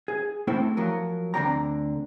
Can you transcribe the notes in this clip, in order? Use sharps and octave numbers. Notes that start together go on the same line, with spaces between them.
G#4
A3 C4 E4 A4 C5 G5
F3 F#3 A#4
D2 D3 C4 D5 G5 A#5